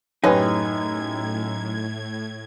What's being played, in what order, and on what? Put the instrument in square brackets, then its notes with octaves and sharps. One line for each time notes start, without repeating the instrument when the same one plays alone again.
[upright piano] F#2 G4 [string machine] A2 G#6 [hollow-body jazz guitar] D#4 [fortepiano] B4 C#5 G#5